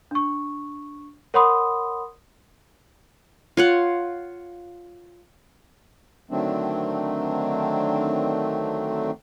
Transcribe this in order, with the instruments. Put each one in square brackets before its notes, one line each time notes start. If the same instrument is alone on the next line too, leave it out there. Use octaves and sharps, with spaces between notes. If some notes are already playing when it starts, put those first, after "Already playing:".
[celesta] D4 C#6
A#4 C#5 F#5 B5 C6 D#6
[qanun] F4 C#5 F#5
[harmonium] D3 D#3 F#3 A3 C4 D4